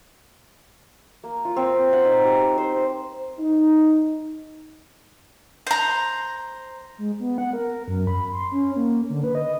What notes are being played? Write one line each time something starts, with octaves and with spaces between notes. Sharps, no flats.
A#3
F4
C4
F#5
D#4
G4
C5
D#4
C5 A#5
G#3
B3
F#5
A#4
F#2
B5
C6
C#4
A#3
D3
B4
D#5